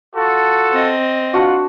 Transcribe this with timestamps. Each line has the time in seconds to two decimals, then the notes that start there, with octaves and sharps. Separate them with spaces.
0.15 F4 F#4 A4
0.72 C4 D#5
1.33 D4 F4 F#4 F#5